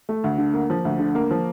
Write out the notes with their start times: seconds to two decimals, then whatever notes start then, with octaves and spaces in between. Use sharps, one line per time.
0.09 A3
0.24 D2
0.38 D3
0.54 A#3
0.70 F3
0.85 D2
0.99 D3
1.15 A#3
1.31 F3